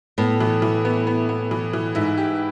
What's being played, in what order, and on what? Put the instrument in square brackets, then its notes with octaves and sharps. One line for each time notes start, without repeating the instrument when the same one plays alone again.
[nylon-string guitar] A2 [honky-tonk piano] B3
[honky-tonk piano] E3
E3
B3
B3
B3
E3
E3
[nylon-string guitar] G#2 [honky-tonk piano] E4
[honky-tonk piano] G4